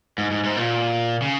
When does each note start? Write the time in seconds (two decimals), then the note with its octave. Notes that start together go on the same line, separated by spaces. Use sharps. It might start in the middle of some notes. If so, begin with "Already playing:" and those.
0.18 G#2
0.31 G#2
0.44 G#2
0.57 A#2
1.22 C#3